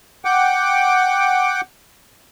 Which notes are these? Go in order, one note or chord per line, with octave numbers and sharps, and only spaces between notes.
F#5 G5 D6